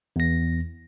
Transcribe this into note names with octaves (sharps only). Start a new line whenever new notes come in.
E2 A#6